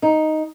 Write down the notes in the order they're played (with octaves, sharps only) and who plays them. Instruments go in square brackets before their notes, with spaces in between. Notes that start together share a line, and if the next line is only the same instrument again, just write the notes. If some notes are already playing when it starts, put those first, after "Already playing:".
[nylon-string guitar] D#4